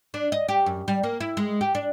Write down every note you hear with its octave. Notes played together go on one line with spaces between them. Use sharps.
D4
D#5
G4
F#2
G3
A#3
E4
G#3
G4
D4